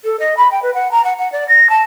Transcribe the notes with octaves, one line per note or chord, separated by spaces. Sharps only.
A4
D#5
B5
G5
B4
F#5
A#5
F#5
F#5
D5
A#6
A5